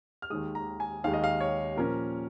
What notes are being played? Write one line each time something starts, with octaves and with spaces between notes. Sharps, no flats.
F6
D#2 D#3 G#3 D#6
A#5
G#5
D#2 D#3 G#3 F5
D#5
F5
C#5
A#2 F3 C#4 A#4